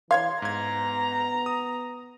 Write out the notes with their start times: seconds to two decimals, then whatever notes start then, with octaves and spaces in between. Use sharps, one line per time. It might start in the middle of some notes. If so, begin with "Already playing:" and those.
0.11 E3 C#5 F5 C6 G#6
0.42 G#2 B3 A#5 G#6
1.46 D#6